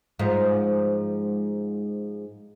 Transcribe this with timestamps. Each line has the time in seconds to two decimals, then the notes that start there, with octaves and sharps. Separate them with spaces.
0.19 G#2 F3